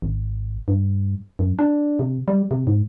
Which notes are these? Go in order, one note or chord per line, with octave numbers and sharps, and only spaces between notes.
G#1
G2
F#2
D4
C3
G3
C3
G#2